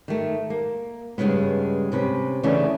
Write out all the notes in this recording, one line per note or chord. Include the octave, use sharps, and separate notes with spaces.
D#3 A3
A#3
G2 A#2 C#3 G#3 B3
C3 C#4 B4
C#3 E3 A3 B3 C#4 D4